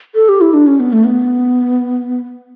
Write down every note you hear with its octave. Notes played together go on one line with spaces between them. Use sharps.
A4
G4
E4
D4
C#4
B3
A3
B3